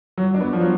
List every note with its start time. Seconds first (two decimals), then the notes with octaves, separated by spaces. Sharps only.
0.17 F#3
0.34 D4
0.41 B3
0.53 F3
0.61 F#3